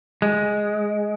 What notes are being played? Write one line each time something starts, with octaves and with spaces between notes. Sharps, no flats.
G#3